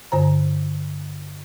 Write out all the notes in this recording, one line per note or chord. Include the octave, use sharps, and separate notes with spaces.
G2 D3 C5 A#5